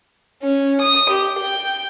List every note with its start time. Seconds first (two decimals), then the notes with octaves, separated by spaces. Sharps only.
0.43 C#4
0.82 D#6
1.10 G4
1.39 G5